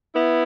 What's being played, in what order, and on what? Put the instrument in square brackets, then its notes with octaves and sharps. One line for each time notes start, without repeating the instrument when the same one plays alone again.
[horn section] B3 E4